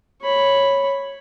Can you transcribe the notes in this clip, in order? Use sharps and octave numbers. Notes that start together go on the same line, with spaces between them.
C#5 B5